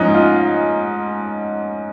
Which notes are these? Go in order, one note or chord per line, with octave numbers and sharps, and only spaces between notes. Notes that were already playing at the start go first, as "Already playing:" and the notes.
Already playing: G#2 F3 C#4 D#4
F4